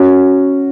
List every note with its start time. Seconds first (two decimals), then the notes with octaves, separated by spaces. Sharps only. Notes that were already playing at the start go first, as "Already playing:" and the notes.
Already playing: C#4 F#4